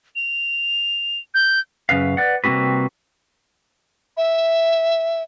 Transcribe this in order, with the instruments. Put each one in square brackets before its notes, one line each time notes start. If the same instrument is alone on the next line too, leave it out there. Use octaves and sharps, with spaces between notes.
[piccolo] F7
G6
[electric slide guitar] F#2 C#3 B4 F5
B4 D5 F#5
C3 G3 A#3 C4 F#4 B4
[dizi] E5